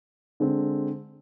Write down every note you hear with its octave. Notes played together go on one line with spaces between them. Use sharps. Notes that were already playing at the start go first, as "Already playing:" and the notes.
D3 G#3 C4